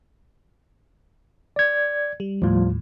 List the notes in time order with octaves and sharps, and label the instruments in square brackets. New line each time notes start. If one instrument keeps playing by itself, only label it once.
[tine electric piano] D5 G#6
[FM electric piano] G3
[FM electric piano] D#2 A2 [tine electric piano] F3 G3 F4